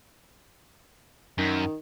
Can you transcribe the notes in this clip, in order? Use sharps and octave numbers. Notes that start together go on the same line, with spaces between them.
F#2 D#3